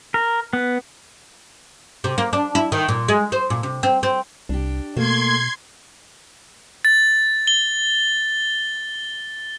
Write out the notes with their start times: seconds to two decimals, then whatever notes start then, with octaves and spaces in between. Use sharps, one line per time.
0.14 A#4
0.53 B3
2.04 C3
2.18 A#3
2.33 D4
2.55 E4
2.72 D#3
2.88 A#2
3.08 G#3
3.32 C5
3.50 A#2
3.63 C3
3.83 C4
4.03 C4
4.49 C2 D4 G4
4.97 B2 A3 A#3 C6 G#6
6.85 A6
7.47 G7